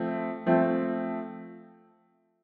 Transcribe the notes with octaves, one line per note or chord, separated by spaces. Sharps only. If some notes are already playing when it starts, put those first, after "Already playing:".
Already playing: F3 A3 C4
F3 A3 C4